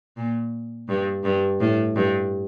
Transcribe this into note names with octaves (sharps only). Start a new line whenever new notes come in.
A#2
G2
G2
A2
G2